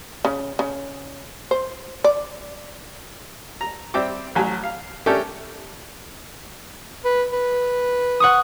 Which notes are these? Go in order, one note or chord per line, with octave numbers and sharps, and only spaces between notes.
C#3
C#3
C5
D5
A#5
G3 C4 E5 G5 D6
A1 F#3 G#5
F5
A3 C#4 D4 G4 A4 A#4
B4
B4
F#5 C#6 D#6